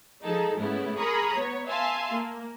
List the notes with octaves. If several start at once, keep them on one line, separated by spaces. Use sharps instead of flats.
F3 G#3 D#4 G#4 A4
G#2 C#3 A3 B3 E4
G#4 A#4 A#5 B5 C#6 D#6
B3 C#5
E5 F5 G#5 A5 C6
A#3